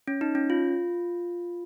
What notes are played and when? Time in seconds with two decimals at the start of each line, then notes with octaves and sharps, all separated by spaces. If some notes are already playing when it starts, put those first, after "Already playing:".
0.08 C#4
0.21 D#4
0.35 C#4
0.50 F4